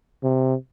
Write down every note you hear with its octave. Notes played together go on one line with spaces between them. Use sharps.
C3